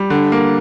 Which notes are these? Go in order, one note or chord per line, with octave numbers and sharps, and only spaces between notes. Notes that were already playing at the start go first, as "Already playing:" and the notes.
Already playing: G3
D3
A#3